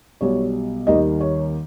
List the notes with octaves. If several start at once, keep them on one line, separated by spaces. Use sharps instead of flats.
B1 B2 G3 C#5
D#2 D#3 G3 D#5
C#5